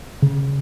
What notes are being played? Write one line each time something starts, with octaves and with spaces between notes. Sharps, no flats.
C#3